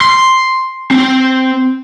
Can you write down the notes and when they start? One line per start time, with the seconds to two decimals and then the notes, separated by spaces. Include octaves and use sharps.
0.01 C6
0.91 C4